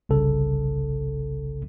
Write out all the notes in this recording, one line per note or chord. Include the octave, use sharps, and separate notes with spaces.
G1 C2 C#3 A4